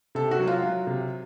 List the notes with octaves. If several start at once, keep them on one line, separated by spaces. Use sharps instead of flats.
C3 A4
F#4
F#3
F4
F#3
C3